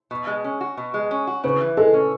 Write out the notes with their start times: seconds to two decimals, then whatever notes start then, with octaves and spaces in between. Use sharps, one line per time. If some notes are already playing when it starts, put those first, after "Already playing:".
0.11 B2
0.27 G#3
0.44 C#4
0.61 F#4
0.77 B2
0.94 G#3
1.11 C#4
1.27 F#4
1.44 C#3 B4
1.61 E3
1.77 G#3 A4
1.93 C#4